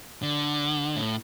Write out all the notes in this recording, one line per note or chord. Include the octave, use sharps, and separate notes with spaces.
D3
A2